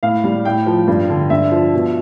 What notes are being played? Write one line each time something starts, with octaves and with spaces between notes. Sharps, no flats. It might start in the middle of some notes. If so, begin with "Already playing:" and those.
A2 F5
G3
A2 G5
F3
G2
D3
G2 E5
F3
B2